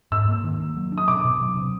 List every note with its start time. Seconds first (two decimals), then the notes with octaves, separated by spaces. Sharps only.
0.12 G#2 E6
0.28 A#3
0.44 D#3
0.60 A#3
0.77 F#3
0.92 D4
0.98 D#6
1.08 B2 D6
1.25 B2
1.41 F#3
1.57 C3